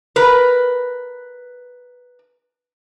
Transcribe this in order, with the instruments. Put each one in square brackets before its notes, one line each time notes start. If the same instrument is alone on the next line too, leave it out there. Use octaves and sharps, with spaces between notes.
[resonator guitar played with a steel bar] A#4 B4